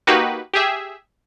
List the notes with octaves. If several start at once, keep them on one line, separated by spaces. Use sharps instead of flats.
A#3 D#4 F#4 G4 B4
G4 G#4 E5